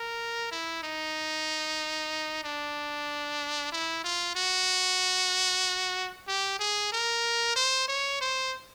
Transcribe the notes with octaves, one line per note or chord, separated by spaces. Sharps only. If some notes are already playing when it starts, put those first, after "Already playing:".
Already playing: A#4
E4
D#4
D4
E4
F4
F#4
G4
G#4
A#4
C5
C#5
C5